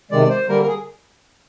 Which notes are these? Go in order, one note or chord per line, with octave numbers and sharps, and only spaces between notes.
C3 D#3 G#3 D5
C5
D3 G3 A#3 A#4
A#4
G#4